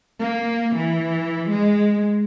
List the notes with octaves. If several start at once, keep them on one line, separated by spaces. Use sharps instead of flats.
A#3
E3
G#3